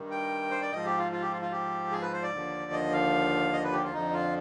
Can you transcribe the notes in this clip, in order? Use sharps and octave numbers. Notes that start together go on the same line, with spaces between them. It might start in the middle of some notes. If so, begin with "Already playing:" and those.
Already playing: G2 D#3
G5
C5
D5
G#2 F3 D#5
G4
F4
F4
G4
F4
F4
G4
G#4
B4
C5
D5
D#2 D3 F3
D#5
F5
D#5
B4
G4
F4
F2 D3 F3 D#4
F4